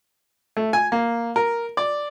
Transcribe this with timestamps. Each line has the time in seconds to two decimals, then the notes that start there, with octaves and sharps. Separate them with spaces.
0.57 A3
0.73 G#5
0.92 A#3
1.36 A#4
1.77 D5